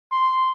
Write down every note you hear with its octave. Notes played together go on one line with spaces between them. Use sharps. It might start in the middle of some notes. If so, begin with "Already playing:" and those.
C6